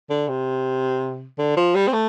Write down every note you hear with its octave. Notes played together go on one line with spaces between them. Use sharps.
D3
C3
D3
F3
G3
C4
A3